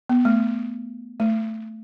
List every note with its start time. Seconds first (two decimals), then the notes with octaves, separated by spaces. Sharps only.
0.09 B3
0.25 A3
1.20 A3